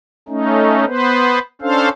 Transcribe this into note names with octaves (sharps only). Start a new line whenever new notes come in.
A3 C#4 D#4
B3 B4 C5
C#4 D4 A4 C5 F5